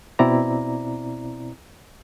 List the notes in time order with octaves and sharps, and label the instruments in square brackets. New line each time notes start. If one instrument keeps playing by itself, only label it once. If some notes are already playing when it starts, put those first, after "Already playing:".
[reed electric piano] B2 C4 E4 D5 A#5